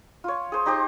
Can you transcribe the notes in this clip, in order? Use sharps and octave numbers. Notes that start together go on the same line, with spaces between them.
F4 C#5
G#4 C5
D#4 G4 C5